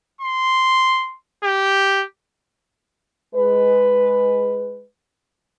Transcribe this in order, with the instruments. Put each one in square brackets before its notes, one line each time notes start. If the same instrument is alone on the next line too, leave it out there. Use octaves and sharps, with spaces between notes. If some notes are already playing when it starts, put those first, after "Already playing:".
[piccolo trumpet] C6
G4
[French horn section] G#3 B4